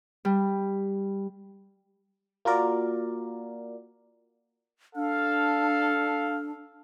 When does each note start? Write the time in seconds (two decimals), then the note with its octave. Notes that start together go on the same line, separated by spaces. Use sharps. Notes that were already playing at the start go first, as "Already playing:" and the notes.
0.25 G3
2.45 A#3 F4 F#4 A#4 D5
4.96 D4 A4 F5